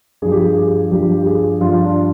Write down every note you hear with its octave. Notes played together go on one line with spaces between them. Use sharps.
G2 F3 G#4
G4
G#4
G#4
G2 F3 G4
G4
G#4
G2 F3 F4
D4